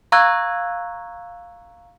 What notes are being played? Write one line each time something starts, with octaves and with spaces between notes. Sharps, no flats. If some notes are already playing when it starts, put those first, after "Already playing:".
F5 A#5 C#6 E6 F#6 G#6